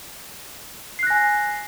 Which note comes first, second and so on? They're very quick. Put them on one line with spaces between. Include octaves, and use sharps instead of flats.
C7 F#6 A#6 G#5